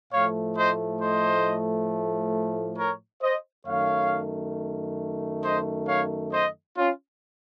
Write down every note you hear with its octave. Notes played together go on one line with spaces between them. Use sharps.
A2 F3 A3 C#5 F5
C5 D#5
C5 D#5
A#4 C#5
C5 D#5
F#2 D#3 A3 C#5 F5
C5 D#5
C#5 F5
C5 D#5
C#4 F4